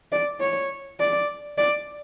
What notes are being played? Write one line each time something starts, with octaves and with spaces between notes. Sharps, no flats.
D5
C#5
D5
D5